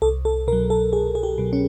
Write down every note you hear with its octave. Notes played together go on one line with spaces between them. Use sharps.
C2 A4
A4
B2 A#4
F#3
A4
C2 G#4
G#4
G4
B2 F#3
C#4